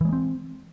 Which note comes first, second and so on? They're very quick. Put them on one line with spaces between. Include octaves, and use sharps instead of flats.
E3 G#3 A#3 C4